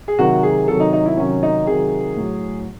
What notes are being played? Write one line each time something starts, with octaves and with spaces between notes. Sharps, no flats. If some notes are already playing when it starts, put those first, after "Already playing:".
G#4
C3 D#3 F#3 F#4
G#4
C3 D#3 F#3 A4
D#4
D#4
E4
C3 D#3 F#3 C#4
D#4
C3 D#3 F#3 G#4
A2 F#3